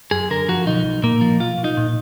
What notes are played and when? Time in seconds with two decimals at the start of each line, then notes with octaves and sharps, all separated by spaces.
0.11 F#2 G#4
0.30 D3 A#4
0.48 F3 F#4
0.66 B1 D#4
0.85 B1
1.03 A#2 A#3
1.21 F3
1.40 B1 F4
1.58 B1
1.64 D#4
1.77 A#2